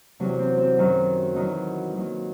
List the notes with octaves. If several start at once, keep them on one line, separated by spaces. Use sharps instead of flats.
E2 C3 F#3
C4
C4
F#2 D#3 F#3
E2 D#3 F#3 D#4
D#2 D#3 F#3